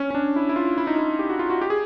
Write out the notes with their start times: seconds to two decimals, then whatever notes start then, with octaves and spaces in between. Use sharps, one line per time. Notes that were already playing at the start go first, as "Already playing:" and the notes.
Already playing: C#4
0.10 C#4
0.15 D4
0.36 E4
0.49 E4
0.56 F4
0.78 E4
0.87 D#4
0.98 E4
1.19 G4
1.30 F#4
1.39 F4
1.50 F#4
1.61 G4
1.70 G#4